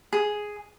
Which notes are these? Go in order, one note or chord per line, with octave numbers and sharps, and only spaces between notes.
G#4